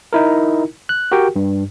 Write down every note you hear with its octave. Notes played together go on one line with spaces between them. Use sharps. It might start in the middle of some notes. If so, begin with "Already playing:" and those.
D#4 E4 A#4
F#6
F#4 G4 A#4 G5
G2